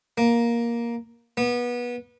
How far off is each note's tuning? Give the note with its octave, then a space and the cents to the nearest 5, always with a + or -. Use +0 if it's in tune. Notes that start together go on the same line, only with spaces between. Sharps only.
A#3 +10
B3 -25